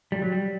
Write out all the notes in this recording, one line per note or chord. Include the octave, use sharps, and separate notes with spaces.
G3
F#3
G3